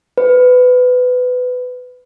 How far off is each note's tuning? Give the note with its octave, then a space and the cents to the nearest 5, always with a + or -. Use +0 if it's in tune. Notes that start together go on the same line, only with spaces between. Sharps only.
B4 +20